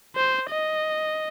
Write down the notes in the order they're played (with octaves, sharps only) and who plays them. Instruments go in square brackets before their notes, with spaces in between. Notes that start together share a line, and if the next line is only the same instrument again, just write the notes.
[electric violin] C5
D#5